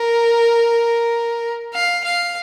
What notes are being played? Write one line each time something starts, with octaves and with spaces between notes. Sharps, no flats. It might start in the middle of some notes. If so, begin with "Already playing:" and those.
Already playing: A#4
F5
F5